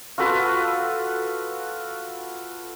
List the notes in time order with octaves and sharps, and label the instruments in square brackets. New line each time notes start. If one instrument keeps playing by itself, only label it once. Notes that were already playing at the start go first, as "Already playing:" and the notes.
[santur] F4 F#4 A4 B4